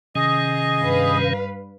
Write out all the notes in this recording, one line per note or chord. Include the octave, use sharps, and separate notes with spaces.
C3 D#3 C#4 G#4 D#5
G2 B4 F5